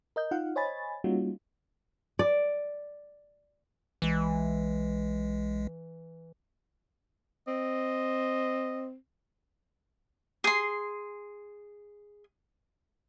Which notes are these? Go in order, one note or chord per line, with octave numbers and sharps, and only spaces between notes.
A#4 D#5 G6
D#4 F4 F5 F#5
C5 C#5 D#5 G#5 B5 A6
G3 A#3 C#4 D#4 F4 F#4
D5
B1 E3 G#3
C4 D#5
G#4 C6